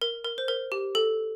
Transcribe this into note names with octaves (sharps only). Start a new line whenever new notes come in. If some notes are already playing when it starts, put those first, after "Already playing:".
A#4
A#4
C5
A#4
G4
A4